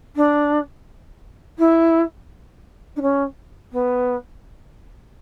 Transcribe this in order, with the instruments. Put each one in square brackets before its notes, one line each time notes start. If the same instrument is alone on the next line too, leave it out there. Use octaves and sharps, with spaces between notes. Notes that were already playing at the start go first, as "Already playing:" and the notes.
[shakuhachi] D4
E4
D4
C#4
B3